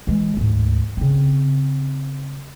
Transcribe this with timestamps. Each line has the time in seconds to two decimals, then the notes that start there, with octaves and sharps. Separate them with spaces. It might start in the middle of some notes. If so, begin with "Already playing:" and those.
0.07 E3 G#3
0.37 D2 G#2
0.97 C#3 C4